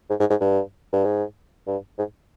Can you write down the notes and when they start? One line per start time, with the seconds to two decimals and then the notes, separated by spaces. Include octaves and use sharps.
0.10 G#2
0.20 G#2
0.30 G#2
0.40 G2
0.93 G2
1.05 G#2
1.67 G2
1.98 G#2